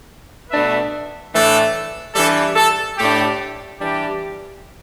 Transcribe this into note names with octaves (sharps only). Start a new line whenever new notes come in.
B2 A3 D4 B4 E5
A2 E3 A3 D4 A4
E3 G3 D4 A4
A4
A2 A3 D4 G4
E3 G3 D4 G4